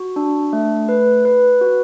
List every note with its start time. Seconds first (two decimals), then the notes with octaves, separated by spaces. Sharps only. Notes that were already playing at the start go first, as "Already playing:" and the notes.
Already playing: F#4
0.16 D4
0.53 A3
0.89 B4
1.25 B4
1.61 F#4